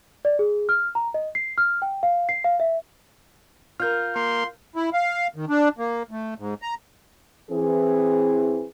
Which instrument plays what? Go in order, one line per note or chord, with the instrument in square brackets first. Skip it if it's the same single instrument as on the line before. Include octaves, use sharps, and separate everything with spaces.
[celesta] D5
G#4
F6
A#5
D#5
C7
F6
G5
F5
C7
F5
E5
[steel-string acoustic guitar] F4 A#4 [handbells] F6 G6
[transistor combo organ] A#3 [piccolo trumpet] C6
[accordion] E4
F5
D#3
D4
A#3
A3
G#2
A#5
[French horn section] E3 C4 G#4